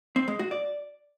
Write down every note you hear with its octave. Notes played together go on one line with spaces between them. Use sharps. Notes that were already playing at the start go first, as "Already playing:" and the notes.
C4
G#3
F#4
D5